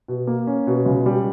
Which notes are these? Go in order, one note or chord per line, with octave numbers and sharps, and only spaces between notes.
B2
A#3
C#4
B2
C#2
G3